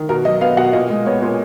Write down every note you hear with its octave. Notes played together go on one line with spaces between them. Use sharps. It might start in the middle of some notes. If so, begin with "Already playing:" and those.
Already playing: D#3
B2 A#4
F#3 D#5
B3 F5
B2 F#5
A#2 D#5
G#3
B3 C#5
A#2